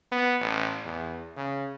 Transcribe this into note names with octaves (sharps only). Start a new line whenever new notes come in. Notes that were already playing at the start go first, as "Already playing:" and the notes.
B3
A1
E2
C#3